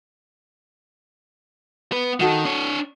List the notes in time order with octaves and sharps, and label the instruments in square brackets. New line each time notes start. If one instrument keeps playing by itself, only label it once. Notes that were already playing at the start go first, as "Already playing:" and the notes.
[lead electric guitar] B3 B4
[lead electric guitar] D#3 [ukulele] D#4 F#4 A4
[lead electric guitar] D4 C#5